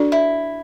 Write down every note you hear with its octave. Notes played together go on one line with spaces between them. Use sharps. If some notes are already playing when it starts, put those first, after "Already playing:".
Already playing: D4 F#4 A4 D5
E4